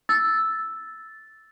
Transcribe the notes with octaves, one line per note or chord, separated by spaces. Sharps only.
E6 A6